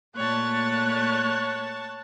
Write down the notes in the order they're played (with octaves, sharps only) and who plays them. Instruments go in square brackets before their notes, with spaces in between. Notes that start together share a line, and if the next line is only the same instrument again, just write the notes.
[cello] A#2 A3 [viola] C#5 A5 [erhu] F#6